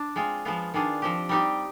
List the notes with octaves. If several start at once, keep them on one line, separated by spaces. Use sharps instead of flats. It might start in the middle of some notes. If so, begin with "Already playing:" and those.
Already playing: D4
G#3 C4 F4 G#4
F3 G#3 B3 F4
D#3 G#3 D4 F4 G#4
F3 C4 G4
G3 C4 D#4 G4